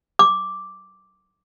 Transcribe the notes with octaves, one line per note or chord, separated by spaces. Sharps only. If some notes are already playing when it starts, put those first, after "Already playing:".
D6